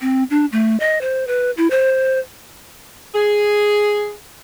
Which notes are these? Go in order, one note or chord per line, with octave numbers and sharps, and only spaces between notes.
C4
D4
A3
D#5
C5
B4
E4
C5
G#4